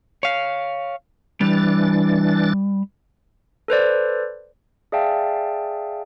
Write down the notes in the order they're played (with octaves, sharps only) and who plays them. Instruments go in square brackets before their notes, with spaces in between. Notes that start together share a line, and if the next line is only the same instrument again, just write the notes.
[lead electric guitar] C#5 F5
[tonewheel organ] E3 D4 A6 [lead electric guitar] G3
[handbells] A4 B4 C5 D5
G#4 D5 E5 F5 G5 A5